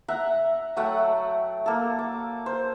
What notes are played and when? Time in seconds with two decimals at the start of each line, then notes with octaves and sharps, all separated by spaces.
0.08 E5 F#5 A#5
0.76 F#3 A3 F#5 G5
1.66 A#3 A4
1.99 D6
2.46 C5